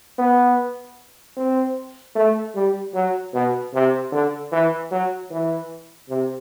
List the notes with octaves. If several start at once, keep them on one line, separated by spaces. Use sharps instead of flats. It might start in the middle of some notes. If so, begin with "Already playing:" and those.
B3
C4
A3
G3
F#3
B2
C3
D3
E3
F#3
E3
C3